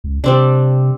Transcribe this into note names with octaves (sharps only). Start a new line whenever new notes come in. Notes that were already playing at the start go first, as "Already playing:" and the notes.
C#2
C3 G3 C4 D4